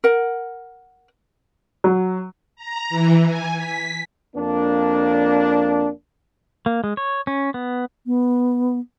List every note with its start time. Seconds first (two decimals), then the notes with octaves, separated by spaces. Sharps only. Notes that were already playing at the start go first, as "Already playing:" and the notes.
0.04 A#4 F#5
1.84 F#3
2.56 A#5
2.90 E3
3.26 G#5
3.56 B6
4.35 F2 A#3 D4
6.66 A#3
6.84 G#3
6.97 C#5
7.27 C#4
7.54 B3
8.06 B3